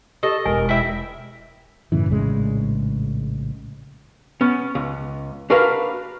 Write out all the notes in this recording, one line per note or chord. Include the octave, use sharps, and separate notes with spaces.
G4 A4 D#5
E1 D#4 A#4 G#5
E4 E5 G5
F#2 A2 C#3 E3
A#1 A2 C#3 G#3
B3 C#4
C#2
D4 F#4 A#4 B4 F5